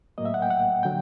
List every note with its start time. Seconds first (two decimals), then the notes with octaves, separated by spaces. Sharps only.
0.18 A2 F#3 A#3 D#5
0.25 E5
0.34 F#5
0.42 G5
0.50 F#5
0.83 D3 F#3 G5